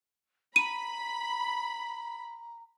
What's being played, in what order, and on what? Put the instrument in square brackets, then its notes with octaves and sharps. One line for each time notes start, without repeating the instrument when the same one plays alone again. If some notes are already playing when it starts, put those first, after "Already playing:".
[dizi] A#5 [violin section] B5 [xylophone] D#7